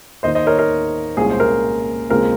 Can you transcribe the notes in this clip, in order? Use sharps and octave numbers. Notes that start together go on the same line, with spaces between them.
D#2 D#3 A#3 D#4 C5 D#5
C5 D#5
A#4 C#5
A#4
C2 A#2 G#3 C#4 F4 G#4
C5
A#4
D#2 C#3 G#3 C4 F4 A#4